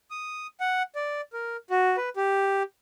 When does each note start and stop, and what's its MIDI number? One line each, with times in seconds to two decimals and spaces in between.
0.11 0.47 87
0.60 0.83 78
0.95 1.21 74
1.33 1.57 70
1.70 1.96 66
1.97 2.09 71
2.16 2.63 67